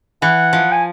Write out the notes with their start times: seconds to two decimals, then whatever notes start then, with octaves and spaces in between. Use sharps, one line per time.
0.22 E3 F#5
0.53 F3
0.72 G#5